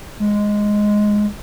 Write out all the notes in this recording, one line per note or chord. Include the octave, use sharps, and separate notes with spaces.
G#3